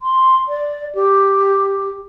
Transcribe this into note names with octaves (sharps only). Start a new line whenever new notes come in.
C6
D5
G4